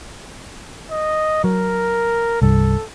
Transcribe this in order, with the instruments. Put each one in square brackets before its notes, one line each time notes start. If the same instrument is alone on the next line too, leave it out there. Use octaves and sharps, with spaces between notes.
[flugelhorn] D#5
[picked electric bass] F#3 [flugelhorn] A#4
[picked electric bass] C2 G2 [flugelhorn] A4